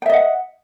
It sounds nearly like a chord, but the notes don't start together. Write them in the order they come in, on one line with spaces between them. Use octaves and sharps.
G5 E5 D#5 F#5